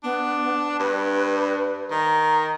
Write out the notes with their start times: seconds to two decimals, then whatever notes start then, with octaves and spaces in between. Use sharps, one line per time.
0.04 B3 D4
0.79 G2 B4
1.91 D#3 A#5